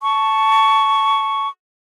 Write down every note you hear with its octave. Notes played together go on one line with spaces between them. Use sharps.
A5 C#6